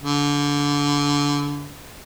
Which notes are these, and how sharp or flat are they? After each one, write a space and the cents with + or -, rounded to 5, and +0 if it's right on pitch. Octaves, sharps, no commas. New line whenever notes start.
D3 -30